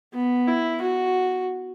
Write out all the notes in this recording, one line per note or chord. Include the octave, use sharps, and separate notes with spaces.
B3
E4
F#4